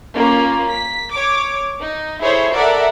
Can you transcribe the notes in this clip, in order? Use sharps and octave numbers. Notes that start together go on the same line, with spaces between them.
A#3 C#4 F4
B6
C#5 D6
D#4
E4 G#4 A4 C5 C#5
A4 A#4 D5 E5 F#5